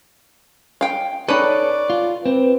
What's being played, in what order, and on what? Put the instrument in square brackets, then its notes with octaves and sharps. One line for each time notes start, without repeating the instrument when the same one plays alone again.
[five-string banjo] F5 G5
[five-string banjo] D#4 B4 [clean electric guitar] A4 C#5 [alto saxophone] D5
[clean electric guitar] F4
[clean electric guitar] C4 [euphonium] B4